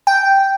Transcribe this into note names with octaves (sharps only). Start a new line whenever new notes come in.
G5